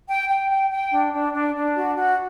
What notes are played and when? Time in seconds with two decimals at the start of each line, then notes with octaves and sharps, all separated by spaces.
0.08 G5
0.29 G5
0.49 G5
0.70 G5
0.91 D4
1.13 D4
1.33 D4
1.54 D4
1.74 F#4
1.95 F#4